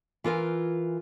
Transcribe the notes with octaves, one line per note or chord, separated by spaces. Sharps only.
E3 F4 A#4 G#5